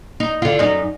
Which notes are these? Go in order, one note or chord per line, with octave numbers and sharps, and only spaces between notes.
D#4
D3 F4
F#2 D#4